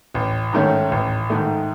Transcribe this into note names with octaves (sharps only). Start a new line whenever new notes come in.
A1
G#2 D#3 A3 C#4
A1
G#2 D#3 A3